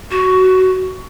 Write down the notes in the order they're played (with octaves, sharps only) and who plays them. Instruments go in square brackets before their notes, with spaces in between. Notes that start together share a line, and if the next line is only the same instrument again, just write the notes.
[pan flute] F#4